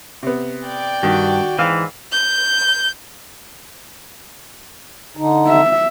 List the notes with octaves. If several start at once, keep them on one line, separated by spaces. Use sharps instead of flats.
C3 B3
D5 G5
G2 D#3 F#4
G#2 E3 F5
G6
D3 D#4
E5